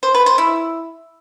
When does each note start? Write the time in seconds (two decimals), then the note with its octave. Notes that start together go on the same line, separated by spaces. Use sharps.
0.03 C5
0.15 B4
0.26 C5
0.38 E4